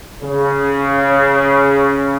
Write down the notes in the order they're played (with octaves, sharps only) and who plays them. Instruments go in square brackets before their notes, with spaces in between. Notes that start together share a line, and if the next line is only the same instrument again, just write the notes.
[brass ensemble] C#3